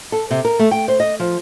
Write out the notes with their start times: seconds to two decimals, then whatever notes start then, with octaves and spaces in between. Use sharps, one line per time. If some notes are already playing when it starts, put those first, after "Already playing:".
0.12 A4
0.31 C3
0.45 A#4
0.59 A3
0.71 G5
0.88 C5
1.00 D#5
1.20 F3